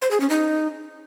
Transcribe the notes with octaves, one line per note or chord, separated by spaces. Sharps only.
C5
G#4
C#4
D#4